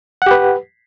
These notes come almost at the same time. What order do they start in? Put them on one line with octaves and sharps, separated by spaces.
F#5 G4 B4